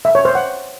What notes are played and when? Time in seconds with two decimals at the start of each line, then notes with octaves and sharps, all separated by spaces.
0.05 E5
0.15 C#5
0.25 C5
0.35 F#5